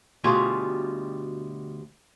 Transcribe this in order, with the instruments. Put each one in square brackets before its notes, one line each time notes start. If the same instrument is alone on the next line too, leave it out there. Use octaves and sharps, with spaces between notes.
[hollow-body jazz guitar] D2 B2 G3 F4 G#4 G#5